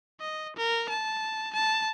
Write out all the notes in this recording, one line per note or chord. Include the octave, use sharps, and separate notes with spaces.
D#5
A#4
A5
A5